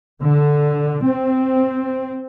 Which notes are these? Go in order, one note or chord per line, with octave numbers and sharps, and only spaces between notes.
D3
C4